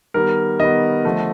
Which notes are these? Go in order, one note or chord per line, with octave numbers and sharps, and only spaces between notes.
D#3 G3 B3 A#4
D#3 G3 B3 D#5
D3 F3 A3